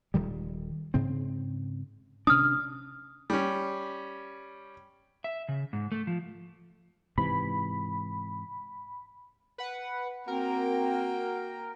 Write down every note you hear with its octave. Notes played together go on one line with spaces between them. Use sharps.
D#1 D#3 G3
G#2 C#3 C4
C3 C#4 D4 D#6 F6
G3 C#4
E5
C#3
G#2
A3
F3
G#2 C3 E3 B5
B4 F#5
A#3 C4 F#4 A#4 G5